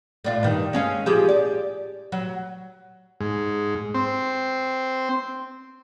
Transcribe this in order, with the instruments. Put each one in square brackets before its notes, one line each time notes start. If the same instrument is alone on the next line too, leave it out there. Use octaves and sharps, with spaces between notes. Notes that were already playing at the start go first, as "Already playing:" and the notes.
[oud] A2 D4 F4
G2 D#3
G#3 C#4 F5
F3 G4 G#4
D5
F#3
[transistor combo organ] G#2
C4